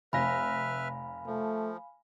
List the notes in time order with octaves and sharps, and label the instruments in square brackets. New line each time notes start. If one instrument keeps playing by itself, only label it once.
[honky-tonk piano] F1 A#6 [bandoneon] B4 E5 F6 [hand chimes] F5 G#5 B5
[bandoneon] F3 [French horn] A3